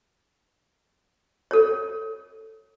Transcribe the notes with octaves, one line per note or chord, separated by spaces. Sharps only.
A4 C#5